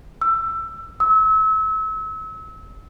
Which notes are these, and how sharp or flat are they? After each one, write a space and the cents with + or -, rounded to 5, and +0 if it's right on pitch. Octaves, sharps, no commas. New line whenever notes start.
E6 +20
E6 -30